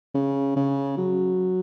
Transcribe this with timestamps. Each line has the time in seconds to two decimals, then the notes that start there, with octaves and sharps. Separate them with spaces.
0.14 C#3
0.56 C#3
0.97 F#3